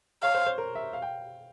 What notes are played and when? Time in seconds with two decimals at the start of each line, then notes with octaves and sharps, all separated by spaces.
0.23 C#5 F5
0.35 C5
0.46 C5
0.58 A#4
0.75 E5
0.93 F5
1.02 G5